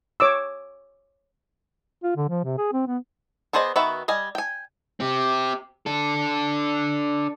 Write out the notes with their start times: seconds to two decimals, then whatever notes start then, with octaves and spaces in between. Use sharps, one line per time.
0.20 C#5 D6 E6
2.03 F4
2.16 D3
2.29 F3
2.44 C3
2.58 G#4
2.73 C4
2.87 B3
3.53 B3 G#4 C5 D5 D#5
3.76 D#3 B3 F#4 B4 E5
4.08 G3 D#5 G#5
4.35 G5 G#5
5.00 C4 G4
5.86 D4 A4